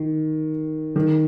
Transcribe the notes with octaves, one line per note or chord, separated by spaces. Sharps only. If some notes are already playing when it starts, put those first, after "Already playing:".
Already playing: D#3
D#3